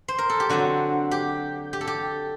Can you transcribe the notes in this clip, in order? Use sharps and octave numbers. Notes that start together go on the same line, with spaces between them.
C5
A#4
A4
G4
D3 F#3 C4 F#4
G4
G4
A4
G4